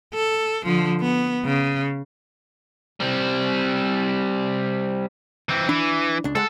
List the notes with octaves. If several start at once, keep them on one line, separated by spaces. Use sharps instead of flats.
A4
D3 F3
B3
C#3
G3 C4
E3 C4
E3 D4
C#2 D4
G#3 A4 F#5